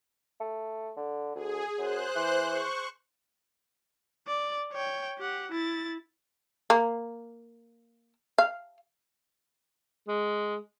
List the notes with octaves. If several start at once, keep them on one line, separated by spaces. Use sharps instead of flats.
A3
D3
D2 G#4
F#2 C5 F#6
E3
C#6
D5
C#5 G5
G4 F#5
E4 A6
A#3
F5
G#3